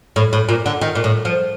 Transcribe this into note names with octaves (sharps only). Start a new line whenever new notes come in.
A2
A2
A#2
D3
D#3
A#2
A2
F3